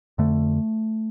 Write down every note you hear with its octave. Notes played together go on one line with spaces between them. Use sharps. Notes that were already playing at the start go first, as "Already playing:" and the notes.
F2 D3 A3